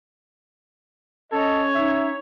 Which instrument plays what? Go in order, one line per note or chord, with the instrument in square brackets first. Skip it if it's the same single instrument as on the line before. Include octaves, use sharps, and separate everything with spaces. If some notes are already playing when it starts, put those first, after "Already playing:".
[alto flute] C#4 [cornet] A4 [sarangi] C#5 [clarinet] D#5
[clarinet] D#4 [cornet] E5